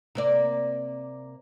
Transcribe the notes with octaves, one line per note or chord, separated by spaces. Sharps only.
C3 A#3 D5